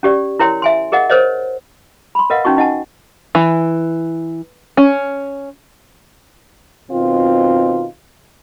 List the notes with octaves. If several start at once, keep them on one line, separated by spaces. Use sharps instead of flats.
C#4 G4 D5
E4 A#4 C#5 G5 C6
E5 G#5 C6
G#4 A#4 D#5 F#5
A#4 C5 C#5 D#5
B5 C6
A#4 B4 D#5 F5 F#5
C#4 D#4 F#4 C#6
D#4 D#5 F#5 G#5 A5
E3
C#4
B2 D#3 C4 F4